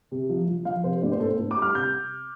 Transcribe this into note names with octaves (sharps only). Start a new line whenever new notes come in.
C3
F3
F3
F3 F5
C3 C5
A2 D5
C5
A2 A4
C5
A2
D6
G3
F6
C3 G6